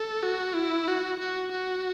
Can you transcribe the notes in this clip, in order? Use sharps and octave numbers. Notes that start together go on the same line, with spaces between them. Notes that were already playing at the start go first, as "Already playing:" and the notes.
Already playing: A4
F#4
E4
F#4
F#4
F#4